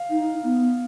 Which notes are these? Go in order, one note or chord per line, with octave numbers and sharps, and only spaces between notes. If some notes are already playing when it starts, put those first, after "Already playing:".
Already playing: F5
D#4
B3